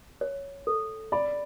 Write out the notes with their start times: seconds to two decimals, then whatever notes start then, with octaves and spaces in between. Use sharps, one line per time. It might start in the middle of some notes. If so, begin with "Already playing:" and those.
0.21 C#5
0.67 A4
1.12 D5 B5